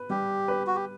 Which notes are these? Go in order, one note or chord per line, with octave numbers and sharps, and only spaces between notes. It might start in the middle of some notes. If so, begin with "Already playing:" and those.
Already playing: B4
G3 G4
B4
F#4
G4